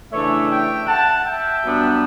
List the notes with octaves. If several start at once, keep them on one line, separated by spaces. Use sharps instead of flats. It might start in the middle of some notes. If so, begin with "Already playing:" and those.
C#3 E3 A3 D4 C#5 E5
E5 G5
F#5 A5
E5 G5
G2 F#3 B3 D4